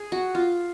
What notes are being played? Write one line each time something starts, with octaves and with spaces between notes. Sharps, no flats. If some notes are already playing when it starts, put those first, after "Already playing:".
Already playing: G#4
F#4
F4